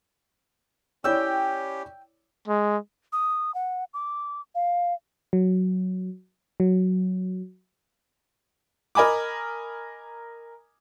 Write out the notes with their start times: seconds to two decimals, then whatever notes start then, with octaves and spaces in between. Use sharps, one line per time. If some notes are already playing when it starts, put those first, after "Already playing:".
1.04 C#4 E4 G4 C#5 D5 G5 E6
2.48 G#3
3.13 D#6
3.55 F#5
3.94 D6
4.55 F5
5.33 F#3
6.60 F#3
8.95 A#4 D#5 G#5 B5 D6